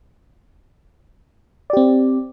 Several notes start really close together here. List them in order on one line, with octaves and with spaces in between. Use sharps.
D5 G4 C4